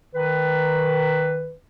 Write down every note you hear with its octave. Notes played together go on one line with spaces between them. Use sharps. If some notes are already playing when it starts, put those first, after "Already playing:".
D#3 B4